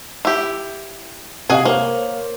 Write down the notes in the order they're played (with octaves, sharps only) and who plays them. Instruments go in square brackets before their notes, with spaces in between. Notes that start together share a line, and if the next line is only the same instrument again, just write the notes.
[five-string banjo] E4 G4
[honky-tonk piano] C3 D#5 F5 [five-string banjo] F#4 G#4 G#5
[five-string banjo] A#3 [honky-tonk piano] A#4 C5 C#5